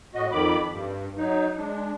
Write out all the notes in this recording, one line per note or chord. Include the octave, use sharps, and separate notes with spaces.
A2 F#4 D#5
F2 D#3 B5 D6
G2
F#3 D#4
G#3 D4